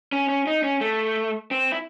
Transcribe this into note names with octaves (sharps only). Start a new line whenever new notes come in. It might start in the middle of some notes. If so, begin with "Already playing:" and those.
C#4
C#4
D#4
C#4
A3
C4
E4